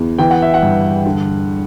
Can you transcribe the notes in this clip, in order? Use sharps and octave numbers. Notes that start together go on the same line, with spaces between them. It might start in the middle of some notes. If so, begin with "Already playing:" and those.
Already playing: E2
E3 G5
F#5
E5
F#5
G2
D3